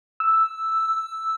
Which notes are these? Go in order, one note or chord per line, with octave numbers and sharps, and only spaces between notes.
E6